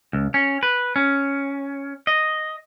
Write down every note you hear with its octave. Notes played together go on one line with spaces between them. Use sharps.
C#2
C#4
B4
C#4
D#5